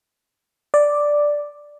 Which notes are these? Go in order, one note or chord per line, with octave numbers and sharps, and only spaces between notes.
D5